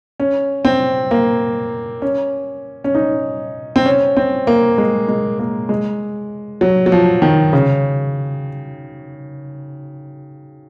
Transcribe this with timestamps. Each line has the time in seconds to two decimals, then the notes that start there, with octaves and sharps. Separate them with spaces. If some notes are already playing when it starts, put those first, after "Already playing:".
0.20 C#4
0.65 C4
1.11 A#3
2.02 C#4
2.84 C#4
2.95 D#4
3.76 C4
3.86 C#4
4.17 C4
4.47 A#3
4.78 G#3
5.08 G#3
5.39 A#3
5.69 G#3
6.61 F#3
6.86 F#3
6.92 F3
7.22 D#3
7.53 C#3